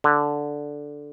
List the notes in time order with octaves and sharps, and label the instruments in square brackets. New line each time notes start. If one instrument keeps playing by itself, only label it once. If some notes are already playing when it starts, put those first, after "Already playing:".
[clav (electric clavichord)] D3